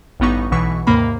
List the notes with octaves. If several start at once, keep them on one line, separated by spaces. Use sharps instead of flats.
A1 G2 G3 B3 D#4 C#6
B1 B2 E3 C#6 B6
D#2 G#2 C3 A#3 B5